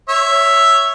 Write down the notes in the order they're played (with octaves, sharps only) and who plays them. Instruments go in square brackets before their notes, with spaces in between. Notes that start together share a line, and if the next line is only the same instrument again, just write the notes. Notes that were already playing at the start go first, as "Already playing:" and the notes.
[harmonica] C#5 E5